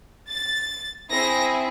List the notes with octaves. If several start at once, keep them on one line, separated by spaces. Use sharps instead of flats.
A6
C4 E4 G#4 A#6